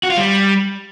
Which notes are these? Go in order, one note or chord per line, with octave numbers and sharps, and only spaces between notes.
F#4
F4
G3